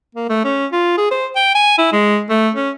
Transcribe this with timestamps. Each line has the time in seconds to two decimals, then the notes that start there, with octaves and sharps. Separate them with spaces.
0.15 A#3
0.29 A3
0.45 C#4
0.72 F4
0.98 G#4
1.11 C5
1.36 G5
1.55 G#5
1.78 E4
1.93 G#3
2.30 A3
2.55 C#4